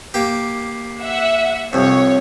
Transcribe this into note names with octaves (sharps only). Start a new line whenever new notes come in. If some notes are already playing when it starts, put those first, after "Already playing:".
A#3 G4
E5 F#5
C2 F2 C#5